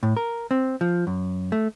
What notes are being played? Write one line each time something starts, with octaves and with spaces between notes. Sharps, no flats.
A2
A#4
C4
F3
F#2
A3